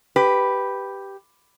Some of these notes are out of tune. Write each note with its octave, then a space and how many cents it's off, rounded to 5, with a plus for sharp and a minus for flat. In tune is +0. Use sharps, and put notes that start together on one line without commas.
G4 +0 B4 +0